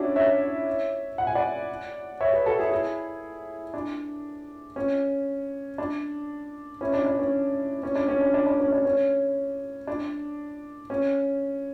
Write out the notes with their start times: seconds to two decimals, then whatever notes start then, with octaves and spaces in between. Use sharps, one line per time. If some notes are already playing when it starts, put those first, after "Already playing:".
Already playing: C#4 D4 E4 F#4
0.16 C#5 E5
1.18 F#5
1.27 G#5
1.35 D5 F#5
2.21 C#5 E5
2.33 G#4 B4
2.46 F#4 A4
2.59 E4 G#4
2.71 E4 G#4
3.74 D4
4.76 C#4
5.78 D4
6.81 C#4 E4
6.94 D4
7.06 D4
7.19 C#4
7.83 C#4
7.96 D4
8.08 C#4
8.21 D4
8.34 D4
8.47 D4
8.60 C#4
8.72 D4
8.85 C#4
9.87 D4
10.90 C#4